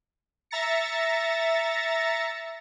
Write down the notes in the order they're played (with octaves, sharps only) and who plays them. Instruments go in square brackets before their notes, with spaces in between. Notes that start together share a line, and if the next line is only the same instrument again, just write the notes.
[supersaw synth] E5 A#5 A6 A#6 C#7